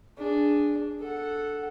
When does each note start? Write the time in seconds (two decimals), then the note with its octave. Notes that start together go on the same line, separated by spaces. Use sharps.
0.18 D4 G#4
1.00 A4 F#5